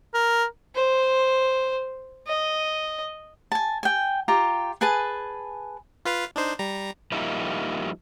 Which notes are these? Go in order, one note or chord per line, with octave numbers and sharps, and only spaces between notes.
A#4
C5
D#5
G#5 A5
G5 G#5
F4 G4 A#5
G#4 B4 G#5 A5
F4 B4 F5
D4 D#4 C5
G3 A#5
F3 G3 A#3 D#4 E4